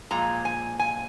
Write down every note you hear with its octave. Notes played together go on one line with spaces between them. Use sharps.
A#2 F3 G#3 A#5
G#5
G#5